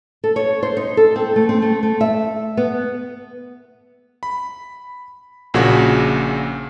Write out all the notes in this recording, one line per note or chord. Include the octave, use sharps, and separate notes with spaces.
A4
C#5
C5
D#4
A4
C4
A3
C4
A3
A3
E5
B3
B5
A#1 A#2 C#3 F#4 G#6